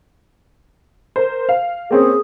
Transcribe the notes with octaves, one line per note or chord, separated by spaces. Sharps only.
A#4 C5
F5
A#3 C4 C#4 G#4